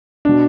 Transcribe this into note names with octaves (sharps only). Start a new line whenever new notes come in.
B2 D4